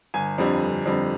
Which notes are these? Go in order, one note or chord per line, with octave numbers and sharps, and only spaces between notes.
G1 G#5
F2 D3 G3
G1
F2 D3 G3